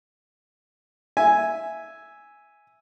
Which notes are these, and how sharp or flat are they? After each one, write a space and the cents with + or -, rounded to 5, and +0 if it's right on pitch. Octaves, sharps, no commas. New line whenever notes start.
E5 -5 G#5 +0